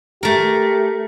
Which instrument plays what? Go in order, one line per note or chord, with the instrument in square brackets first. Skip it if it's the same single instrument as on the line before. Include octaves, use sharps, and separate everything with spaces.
[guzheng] A3 A#4 [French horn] G4